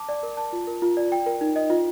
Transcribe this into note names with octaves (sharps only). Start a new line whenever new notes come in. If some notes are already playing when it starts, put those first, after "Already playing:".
Already playing: A5 D6
D5
A#4
A5
F4
A#4
F4
D5
G5
A#4
D#4
D#5
F4